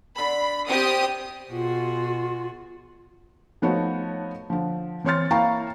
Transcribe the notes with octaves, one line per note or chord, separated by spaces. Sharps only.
D3 B5
C3 C4 G4 D#6
B2 F4 F#4 G#4
F3 A3 B3 D#4 F#4 C#5
D3 F3
E3 C4 C#5 C6 F6 A6
A#3 E4 F5 G5 A#5 C#6